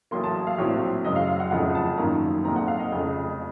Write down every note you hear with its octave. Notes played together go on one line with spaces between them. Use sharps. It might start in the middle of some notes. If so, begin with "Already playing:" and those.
A1 A2 F#3 A#3 C6
A5
F5
A#1 A2 F#3 C4 C#5
F#2 C#3 F#3 D#5
F5
F5
F#5
F1 F2 C#3 F3 F#5
A5
F#2 D#3 A#3 C#4 A#5
A#1 A#2 F3 A3 C4 A#5
F#5
F5
D#5
F1 F2 C#3